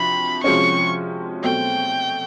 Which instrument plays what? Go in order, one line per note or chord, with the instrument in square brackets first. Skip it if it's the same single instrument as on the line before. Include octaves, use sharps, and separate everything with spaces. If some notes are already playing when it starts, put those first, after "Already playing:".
Already playing: [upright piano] C3 F3 D4 F#4 [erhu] B5
[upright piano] C3 F3 G#3 C#4 F#4 [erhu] C#6
[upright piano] B2 F#3 A3 C4 [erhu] G5